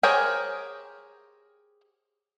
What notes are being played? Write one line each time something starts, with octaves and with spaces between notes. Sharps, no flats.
G4 G#4 A#4 C5 C#5